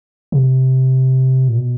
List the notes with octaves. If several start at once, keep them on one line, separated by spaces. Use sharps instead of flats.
C3
A#2
B2